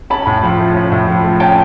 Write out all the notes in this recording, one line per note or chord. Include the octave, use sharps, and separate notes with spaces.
C#4 A5 B5
A2
F3
A3
C#4
A2
F3
A3
C#4 G5 A5